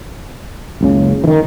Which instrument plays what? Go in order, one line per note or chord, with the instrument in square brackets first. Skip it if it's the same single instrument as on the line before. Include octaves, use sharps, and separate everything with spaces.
[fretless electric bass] F#1 C#2 C#3
D#3 E3